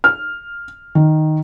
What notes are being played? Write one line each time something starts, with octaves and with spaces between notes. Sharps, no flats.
F6
D#3